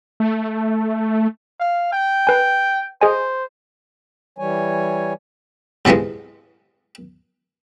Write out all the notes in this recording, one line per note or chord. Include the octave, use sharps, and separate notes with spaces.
A3
F5
G5
B4 G#5
G#4 C5 D#5 G#5
E3 G3 C#5 G#5
G#2 C3 E3 F3 G#3